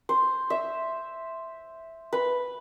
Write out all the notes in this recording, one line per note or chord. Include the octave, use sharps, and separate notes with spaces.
C5
E5
B4